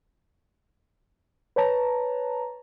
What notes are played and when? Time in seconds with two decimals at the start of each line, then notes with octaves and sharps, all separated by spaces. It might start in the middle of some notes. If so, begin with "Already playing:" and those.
1.56 B4 C#5 A5 A#5